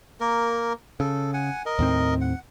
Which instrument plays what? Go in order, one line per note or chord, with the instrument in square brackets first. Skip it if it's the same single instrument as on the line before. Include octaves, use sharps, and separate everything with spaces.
[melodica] A#3 A#4
[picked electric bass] C#3 [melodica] A4
[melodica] F#5 G#5
A#4 D#5
[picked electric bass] D#2 A2 C4
[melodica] F#5